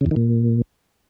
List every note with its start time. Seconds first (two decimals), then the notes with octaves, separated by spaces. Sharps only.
0.01 C#3
0.06 E2
0.11 D#3
0.16 A#2